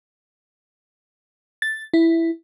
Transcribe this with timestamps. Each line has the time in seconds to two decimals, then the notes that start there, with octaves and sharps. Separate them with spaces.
1.62 A6
1.94 E4